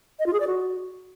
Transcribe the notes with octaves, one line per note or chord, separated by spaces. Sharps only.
D#5
F4
G#4
D5
F#4